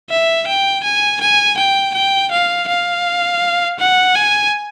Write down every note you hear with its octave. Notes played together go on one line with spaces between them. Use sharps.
E5
G5
G#5
G#5
G5
G5
F5
F5
F#5
G#5